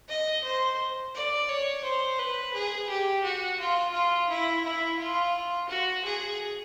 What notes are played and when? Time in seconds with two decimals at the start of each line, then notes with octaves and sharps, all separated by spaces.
0.09 D#5
0.44 C5
1.15 D5
1.49 C#5
1.84 C5
2.19 B4
2.54 G#4
2.89 G4
3.24 F#4
3.59 F4
3.94 F4
4.29 E4
4.64 E4
4.99 F4
5.69 F#4
6.05 G#4